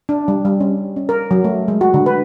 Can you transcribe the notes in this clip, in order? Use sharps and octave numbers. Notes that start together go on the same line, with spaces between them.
D4
G3
G3
C#4
C#4
A#4
F#3
A3
G#3
F#4
D3
B4